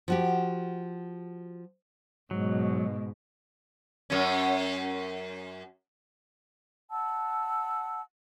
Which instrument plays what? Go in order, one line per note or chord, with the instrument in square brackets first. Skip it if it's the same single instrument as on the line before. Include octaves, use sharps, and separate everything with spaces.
[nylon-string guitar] F3 F#4 G4
[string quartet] G#2 B2 [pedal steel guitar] F#3
[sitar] F#2 C#4
[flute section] F#5 A5 E6